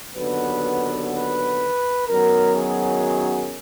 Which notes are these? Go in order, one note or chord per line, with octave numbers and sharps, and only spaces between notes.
D#2 D3 F#3 B3 B4
B4
F#2 D#3 F#3 B3 A#4
G#4